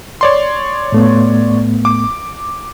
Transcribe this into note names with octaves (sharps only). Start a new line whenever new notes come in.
C#5 D5 C6
A2 A3 B3
D6